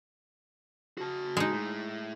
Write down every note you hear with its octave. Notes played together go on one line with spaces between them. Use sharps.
F#4 A5
G#3 D#4
A2